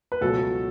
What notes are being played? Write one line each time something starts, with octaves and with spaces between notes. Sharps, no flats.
B4
C#2 B2 F#3 A3 A4